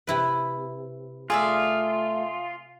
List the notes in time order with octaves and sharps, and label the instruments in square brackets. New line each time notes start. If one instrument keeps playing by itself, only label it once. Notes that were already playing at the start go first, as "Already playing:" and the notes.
[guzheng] C3 E4 B4
[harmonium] A3 [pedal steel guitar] F4 [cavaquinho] G#4 D5 E5